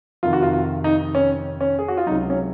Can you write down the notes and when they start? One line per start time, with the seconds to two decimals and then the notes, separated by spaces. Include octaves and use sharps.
0.23 F2 C3 D#3 F4
0.33 F#4
0.42 F4
0.53 F4
0.84 D#4
1.15 C#4
1.61 C#4
1.79 G#4
1.88 F#4
1.97 F4
2.06 C#2 C3 F#3 D#4
2.30 C#4